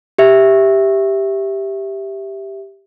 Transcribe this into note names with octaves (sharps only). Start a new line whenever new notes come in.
G4 E5